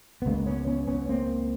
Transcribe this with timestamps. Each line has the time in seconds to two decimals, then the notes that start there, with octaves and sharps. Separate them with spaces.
0.22 B3
0.26 C#2 C#3 G#3 A#3
0.46 B3 C#4
0.67 B3 C#4
0.87 B3 C#4
1.09 A#3 C4